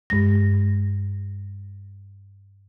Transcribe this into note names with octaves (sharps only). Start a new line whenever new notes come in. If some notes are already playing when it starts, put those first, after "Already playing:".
G2 G#3 A#6